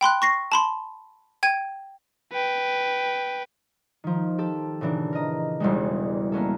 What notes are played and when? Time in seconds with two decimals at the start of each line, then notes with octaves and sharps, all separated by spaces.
0.01 G5 B5 C6 F#6
0.22 C#6 A#6 C7
0.52 A5 B5 C6
1.43 G5 G#6 D#7
2.33 B4 G5
4.04 D#3 F3
4.38 G4 A4
4.81 A#2 C#3 E3 D4
5.13 A#4 D#5
5.60 E1 E2 G3 G#3
6.32 A#3 B3 C#4 A4